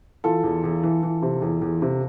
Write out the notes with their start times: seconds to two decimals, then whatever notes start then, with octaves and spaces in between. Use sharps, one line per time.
0.24 E3 F4 A4
0.43 E2
0.64 E2
0.83 E3
1.03 E3
1.22 C3
1.42 E2
1.62 E2
1.82 C3